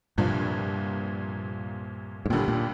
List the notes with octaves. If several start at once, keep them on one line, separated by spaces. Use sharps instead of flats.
C2 G2 A#2 F3
G#2
D#2 A#2 D3 G3
A#2